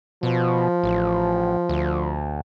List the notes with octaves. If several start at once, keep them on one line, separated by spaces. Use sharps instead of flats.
B2 F3
A1
D2